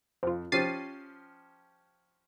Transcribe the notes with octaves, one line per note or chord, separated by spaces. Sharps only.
F2 C4 F4
F3 C#4 G4 A6 C7 D#7